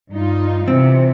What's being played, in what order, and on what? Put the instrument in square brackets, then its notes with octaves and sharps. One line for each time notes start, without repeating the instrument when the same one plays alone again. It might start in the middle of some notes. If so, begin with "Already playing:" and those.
[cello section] G2 D#4 F4
[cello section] C3 E3 [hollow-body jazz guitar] C4